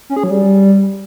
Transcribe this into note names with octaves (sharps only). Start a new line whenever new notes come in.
C#4
G#4
F#3
G3